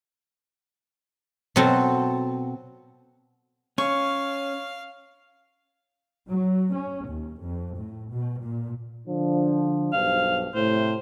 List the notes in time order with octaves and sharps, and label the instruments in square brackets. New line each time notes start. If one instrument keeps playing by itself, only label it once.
[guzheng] B2 F#3 C4 A4
[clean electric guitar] C#4 [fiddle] F5 [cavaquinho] C#6
[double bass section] F#3
C#4
D#2
F2
A2
B2
A#2
[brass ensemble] D3 F3 D4
[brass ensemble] B1 G2 C5 [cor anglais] F5
[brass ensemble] A2 C3 [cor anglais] C5